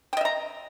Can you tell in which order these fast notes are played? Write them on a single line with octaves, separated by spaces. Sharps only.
G5 D#5 E5 A#5